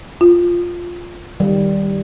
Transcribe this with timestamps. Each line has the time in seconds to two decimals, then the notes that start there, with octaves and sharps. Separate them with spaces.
0.21 F4
1.40 D#3 G3